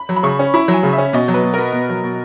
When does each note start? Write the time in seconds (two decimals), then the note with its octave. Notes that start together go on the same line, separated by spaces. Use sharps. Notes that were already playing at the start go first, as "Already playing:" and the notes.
Already playing: B5
0.09 F#3
0.16 B5
0.23 C#3 C#6
0.39 C#4
0.54 E4 B5
0.68 F#3
0.74 G#5
0.83 C#3
0.93 C#4 E5
1.13 B2 D#5
1.28 F#3
1.34 B4
1.44 B2
1.54 B3 A#4
1.73 B2
1.89 F#3
2.04 B2